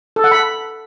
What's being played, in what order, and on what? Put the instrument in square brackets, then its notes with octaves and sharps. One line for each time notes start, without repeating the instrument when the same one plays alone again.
[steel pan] A4
F#5
B5